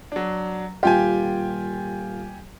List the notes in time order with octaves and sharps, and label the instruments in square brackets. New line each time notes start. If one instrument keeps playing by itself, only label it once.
[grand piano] F#3 D4
[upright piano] D#1 F4 [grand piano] G4 G5 G#5